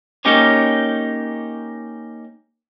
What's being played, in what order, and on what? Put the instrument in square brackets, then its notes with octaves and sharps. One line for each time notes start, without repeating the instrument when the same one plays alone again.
[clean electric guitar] A#3 C#4 D#4 G4 G#4 C#5